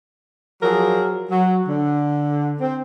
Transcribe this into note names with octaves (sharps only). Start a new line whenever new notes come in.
F3 F#3 G#4 A#4
F#3
D3
C4